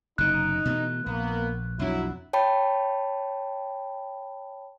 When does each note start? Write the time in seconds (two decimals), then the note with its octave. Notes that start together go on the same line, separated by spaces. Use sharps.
0.18 F#1 C3 D#4 F#6
0.65 B2 E3 A3
1.06 A#1 A#3 B3
1.79 B1 F2 F#3 D4 E4
2.33 C#5 G5 A5 B5